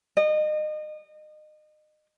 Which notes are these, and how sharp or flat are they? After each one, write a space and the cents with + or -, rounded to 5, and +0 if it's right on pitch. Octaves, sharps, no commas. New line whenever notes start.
D#5 -30